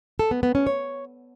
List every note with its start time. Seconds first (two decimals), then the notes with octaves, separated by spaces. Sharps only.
0.19 A4
0.31 B3
0.43 B3
0.55 C#4
0.67 C#5